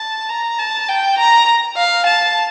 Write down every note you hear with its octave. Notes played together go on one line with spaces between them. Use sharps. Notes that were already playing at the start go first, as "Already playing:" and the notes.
Already playing: A5
A#5
A5
G5
A#5
F5
A5